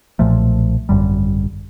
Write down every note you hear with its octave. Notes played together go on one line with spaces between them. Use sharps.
B1 A#2 F3 A3
G#1 F#2 D3 G3